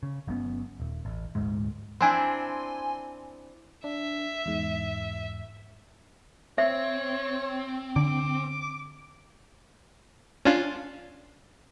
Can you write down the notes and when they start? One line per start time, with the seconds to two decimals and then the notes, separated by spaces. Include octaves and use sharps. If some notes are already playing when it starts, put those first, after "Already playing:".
0.03 C#3
0.27 G1 F#3 B3 C#4
0.80 D#1
1.05 A1
1.35 D#1 D2 G#2 G#3
2.01 C4 D4 E4 G#5 C6
3.84 D4 E5
4.46 E2 G#2
6.58 C4 C#5 E5
7.96 D3 D6
10.45 C#4 D4 F4